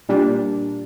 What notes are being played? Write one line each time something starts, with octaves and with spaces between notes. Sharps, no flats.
A#2 G3 D4